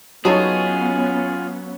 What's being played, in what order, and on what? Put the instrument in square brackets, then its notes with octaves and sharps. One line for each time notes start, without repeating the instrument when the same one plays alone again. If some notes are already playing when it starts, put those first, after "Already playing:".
[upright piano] F#3 [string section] B3 C#4 [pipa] D#4 A4 C#5 [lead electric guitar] F4 G#4